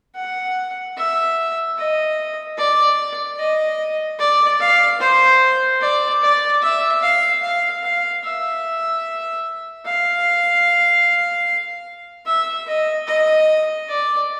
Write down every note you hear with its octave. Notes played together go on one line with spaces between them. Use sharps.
F#5
E5
D#5
D5
D#5
D5
F5
C5
D5
D5
E5
F5
F5
F5
E5
F5
E5
D#5
D#5
D5